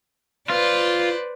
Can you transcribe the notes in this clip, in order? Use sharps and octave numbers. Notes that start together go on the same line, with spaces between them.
F4 B4 C5 D5